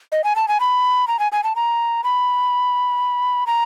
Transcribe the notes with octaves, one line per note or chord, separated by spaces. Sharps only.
D#5
G#5
A5
G#5
B5
A#5
G#5
G#5
A5
A#5
B5
A#5